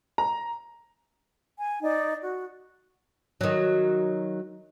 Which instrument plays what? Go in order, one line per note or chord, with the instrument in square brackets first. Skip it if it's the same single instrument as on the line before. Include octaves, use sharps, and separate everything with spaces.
[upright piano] A#5
[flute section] G#5
D#4 D5
F#4
[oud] D#3 F#3